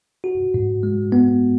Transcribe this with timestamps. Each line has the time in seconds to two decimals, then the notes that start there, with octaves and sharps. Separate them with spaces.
0.24 F#4
0.54 G#2
0.83 G#3
1.12 B3